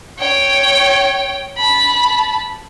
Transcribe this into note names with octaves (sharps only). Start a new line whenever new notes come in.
C#5 G5
A5 B5